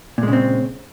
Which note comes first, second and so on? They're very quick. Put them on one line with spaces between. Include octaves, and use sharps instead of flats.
A#2 G#3 C#3 C4